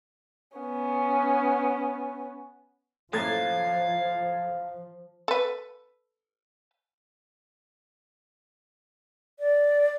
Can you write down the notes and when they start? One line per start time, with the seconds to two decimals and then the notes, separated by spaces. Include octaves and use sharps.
0.58 B3 C#4
3.13 F#2 A2 F3 A#3 A4 F5 G#6 A6
5.28 A4 B4
9.39 D5